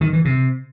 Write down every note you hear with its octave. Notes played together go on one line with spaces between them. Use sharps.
D#3
E3
C3